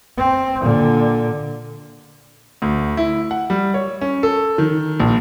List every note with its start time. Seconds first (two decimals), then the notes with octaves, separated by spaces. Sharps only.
0.17 C4
0.60 A#2 D3
2.62 D2
2.97 E4
3.31 F#5
3.50 G3
3.74 C#5
4.01 C#4
4.23 A4
4.58 D#3
5.00 A#1